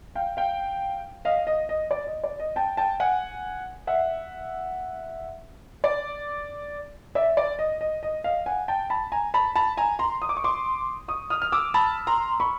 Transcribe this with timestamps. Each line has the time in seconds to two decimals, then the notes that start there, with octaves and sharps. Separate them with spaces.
0.15 F5 G5
0.37 F5 G5
1.25 D#5 F5
1.47 D#5
1.69 D#5
1.91 D5
2.07 D#5
2.24 D5
2.40 D#5
2.56 G5 A5
2.77 G5 A5
3.00 F#5 G#5
3.87 E5 F#5
5.84 D5
7.15 D5 E5
7.37 D5
7.59 D#5
7.81 D#5
8.03 D#5
8.24 D#5 F5
8.46 F#5 G#5
8.68 G5 A5
8.90 A5 B5
9.12 G#5 A#5
9.34 A5 B5
9.55 A5 B5
9.77 G#5 A#5
9.99 A#5 C6
10.22 D#6
10.29 D6
10.37 C#6
10.44 C6 D6
11.08 C#6 D#6
11.30 D#6 F6
11.42 F6
11.52 D6 E6
11.74 A5 B5
12.07 A#5 C6
12.40 B5 C#6